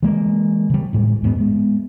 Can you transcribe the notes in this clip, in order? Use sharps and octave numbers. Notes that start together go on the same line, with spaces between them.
E3 G#3 A#3
C#3 G3
A1 A2 G#3
E2 G#2 B3
G#3 B3